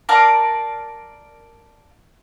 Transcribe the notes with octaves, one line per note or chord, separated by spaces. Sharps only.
A#4 D5 F5 A5